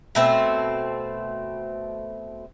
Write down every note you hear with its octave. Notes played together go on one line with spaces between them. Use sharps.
B2 A3 C4